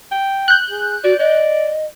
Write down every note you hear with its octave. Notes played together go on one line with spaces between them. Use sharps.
G5
F#6 G6
G#4
F#4 D5
D5 D#5